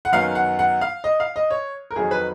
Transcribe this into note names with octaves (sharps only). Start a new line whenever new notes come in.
F#5
F#2 D#3 F#3 B3 F5
F#5
F#5
F5
D#5
F5
D#5
C#5
A#4
F2 D#3 F#3 G#4
B4